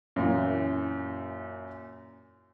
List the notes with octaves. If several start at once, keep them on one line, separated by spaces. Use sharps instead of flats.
F#2 A#2 E3